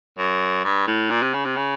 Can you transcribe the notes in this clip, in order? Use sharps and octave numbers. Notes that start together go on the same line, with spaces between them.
F#2
G2
A2
A#2
C3
C#3
C3
C#3